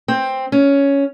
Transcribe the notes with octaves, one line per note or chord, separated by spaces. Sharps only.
C4
C#4